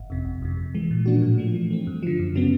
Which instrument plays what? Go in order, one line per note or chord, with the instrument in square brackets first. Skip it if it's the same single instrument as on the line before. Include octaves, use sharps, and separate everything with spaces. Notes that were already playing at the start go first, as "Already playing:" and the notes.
Already playing: [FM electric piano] G1
F2 C3
G1
F2 C3
C3
E3 G#3
A#2
F3 A#3 D4 F#4
A2
F3 A3
E3
A3 C4
G2
D3 F3
F#2
C#3 F#3 B3